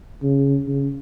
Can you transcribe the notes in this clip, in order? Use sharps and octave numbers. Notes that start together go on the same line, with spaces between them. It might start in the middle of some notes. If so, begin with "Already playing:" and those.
C#3
C#3